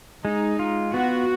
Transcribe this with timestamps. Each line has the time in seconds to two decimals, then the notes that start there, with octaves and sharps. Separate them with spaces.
0.24 G#3 D#4
0.59 F4
0.93 B3 F#4